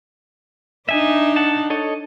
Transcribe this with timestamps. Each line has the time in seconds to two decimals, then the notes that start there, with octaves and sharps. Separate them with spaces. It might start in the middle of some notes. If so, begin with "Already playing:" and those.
0.89 D4 D#4 E5 G#5
1.36 F#5 A5
1.70 A4 C#5 D#5